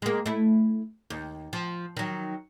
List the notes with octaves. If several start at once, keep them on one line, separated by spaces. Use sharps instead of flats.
G#3 A#3
A3 E4
D#2
F3
D#3 F#3